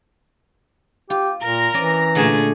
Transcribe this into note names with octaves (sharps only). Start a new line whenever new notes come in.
F4 G4
A#2 A#4 A#5
E3 C#4 D5
A#2 D3 A3 G#4 D5 A5